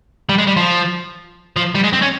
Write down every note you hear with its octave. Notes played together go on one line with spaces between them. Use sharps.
G3
G#3
G3
F3
F3
G3
G#3
C4
C#4